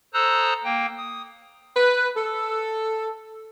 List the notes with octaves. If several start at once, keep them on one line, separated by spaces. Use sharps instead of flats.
A4 C5 A#5 D#6 E6 F#6
A#3 G5
D#6
B4
A4